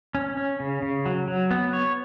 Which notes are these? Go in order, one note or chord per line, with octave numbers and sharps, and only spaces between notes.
C#4
C#4
C#3
C#3
F#3
F#3
B3
C#5